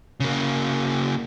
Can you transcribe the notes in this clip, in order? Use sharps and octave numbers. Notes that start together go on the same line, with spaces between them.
C#3 A#3